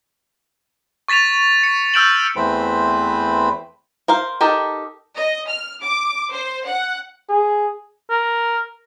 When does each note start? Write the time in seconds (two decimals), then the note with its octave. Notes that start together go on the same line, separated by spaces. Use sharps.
1.08 C#6 A6 B6 E7 F7
1.63 C#7
1.94 E6 F6 G6 D7 E7 F#7
2.36 E2 A3 C4 B4 C5 B5
4.08 A#4 C5 F5
4.41 D#4 G4 A4 A#4
5.17 D#5
5.48 F6
5.81 D6
6.31 C5
6.65 F#5
7.29 G#4
8.10 A#4